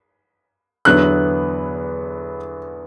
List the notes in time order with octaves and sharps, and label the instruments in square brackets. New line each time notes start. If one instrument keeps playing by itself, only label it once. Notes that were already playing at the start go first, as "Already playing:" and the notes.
[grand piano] E2 D3 F#3 B3 E4 [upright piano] F#6